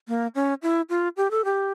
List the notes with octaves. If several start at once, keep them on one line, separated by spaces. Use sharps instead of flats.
A#3
C#4
E4
F4
G4
A4
G4